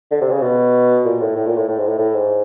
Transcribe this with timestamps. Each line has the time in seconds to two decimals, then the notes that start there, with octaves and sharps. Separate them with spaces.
0.11 D3
0.21 C3
0.31 C#3
0.42 B2
1.05 A#2
1.21 A2
1.36 A2
1.46 A#2
1.57 A2
1.68 A2
1.79 G#2
1.88 A2
1.98 A2
2.15 G#2